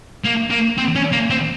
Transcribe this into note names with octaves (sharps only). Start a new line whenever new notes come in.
A#3
A#3
C4
C#4
A#3
C4